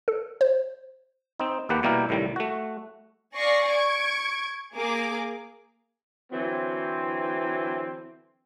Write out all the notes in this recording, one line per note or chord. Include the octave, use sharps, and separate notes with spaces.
A4
C5
C4 D#4
D#2 A#3 G4 B4 F#5
B2 G3 A#3 E4 G4 A#4
C2 A2 D#3 G3
A3 F#4
D5 F5 G#5 C#6 A#6 C7
C#6 G#6 D7
A#3 G#4 D6
D3 E3 F#3 C4